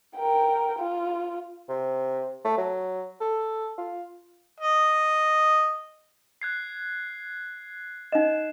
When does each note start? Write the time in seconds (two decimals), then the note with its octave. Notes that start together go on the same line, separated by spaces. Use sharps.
0.16 A#4 G5
0.78 F4
1.69 C3
2.45 A3
2.58 F#3
3.21 A4
3.78 F4
4.60 D#5
6.42 F#6 G#6 C7
8.12 D#4 D#5 E7